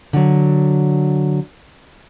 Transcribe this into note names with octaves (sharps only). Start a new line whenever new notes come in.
D3 F#3